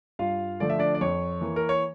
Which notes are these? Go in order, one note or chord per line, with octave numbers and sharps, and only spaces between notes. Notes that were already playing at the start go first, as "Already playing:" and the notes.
G2 F4 F5
D3 F3 A3 D5
E5
D4 D5
D5
F2 C#5
E3 A#3
A#4
C#5